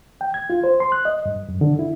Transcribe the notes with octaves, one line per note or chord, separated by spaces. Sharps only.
G5
G#6
F4
C5
C6
F#6
D#5
G2
F#2
D3
E4